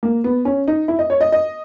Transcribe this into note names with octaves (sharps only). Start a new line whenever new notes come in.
A#3
B3
C#4
D#4
E4
D#5
C#5
D#5
D#5